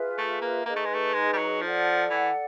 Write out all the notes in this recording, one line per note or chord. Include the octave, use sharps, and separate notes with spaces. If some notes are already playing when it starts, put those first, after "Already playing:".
Already playing: F4 G#4 B4 E5
A3
A#3
A#3 D#4 G#4 B4 D#5
A3
G#3
A3
G#3
G3
F#3
F3 A4 D5 F#5
E3